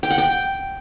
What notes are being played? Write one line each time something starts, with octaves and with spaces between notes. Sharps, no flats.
G5
F#5
G5